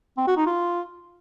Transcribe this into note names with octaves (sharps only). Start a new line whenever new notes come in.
C4
F#4
D#4
F4